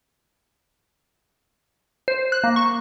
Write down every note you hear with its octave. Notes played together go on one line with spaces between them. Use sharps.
C5
F#6
A#3
C#6